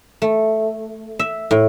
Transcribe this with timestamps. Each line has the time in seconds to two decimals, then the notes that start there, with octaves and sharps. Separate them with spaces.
0.22 A3
1.19 E5
1.51 A2